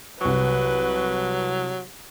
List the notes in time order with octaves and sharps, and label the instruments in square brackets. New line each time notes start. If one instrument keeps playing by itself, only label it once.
[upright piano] C2 C#6 [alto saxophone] F#3 [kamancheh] B4